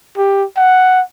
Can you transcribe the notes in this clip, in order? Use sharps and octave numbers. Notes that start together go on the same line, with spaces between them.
G4
F#5